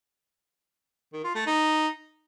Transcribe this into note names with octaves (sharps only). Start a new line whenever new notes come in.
D#3
F4
A3
D#4